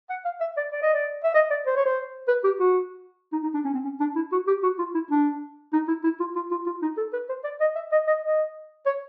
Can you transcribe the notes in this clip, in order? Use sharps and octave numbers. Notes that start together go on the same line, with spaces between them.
F#5
F5
E5
D5
D5
D#5
D5
E5
D#5
D5
C5
C#5
C5
B4
G4
F#4
D#4
D#4
D4
C#4
C4
C#4
D4
E4
F#4
G4
F#4
F4
E4
D4
D#4
E4
E4
F4
F4
F4
F4
D#4
A4
B4
C5
D5
D#5
E5
D#5
D#5
D#5
C#5